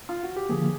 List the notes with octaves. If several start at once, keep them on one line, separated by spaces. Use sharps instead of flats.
F4
F#4
G4
D3 F3 A#3 G#4